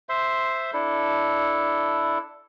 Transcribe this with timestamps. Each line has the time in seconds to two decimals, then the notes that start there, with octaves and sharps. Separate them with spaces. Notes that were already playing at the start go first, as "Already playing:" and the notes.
0.09 C5 E5 C6
0.73 D4 E4 A4